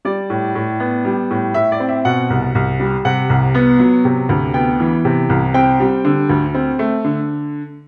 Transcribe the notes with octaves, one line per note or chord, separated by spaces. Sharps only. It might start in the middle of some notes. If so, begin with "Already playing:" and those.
G3 D5
A2
A2
B3
G3
A2
A2 E5
D5
C4
E5
B2 F#5
C2
C2
G3
C3 F#5
C2
B3
F#3
C3
D2
B3 G5
E3
C3
C2
C4 G5
G3
D3
D2
C4
A3
D3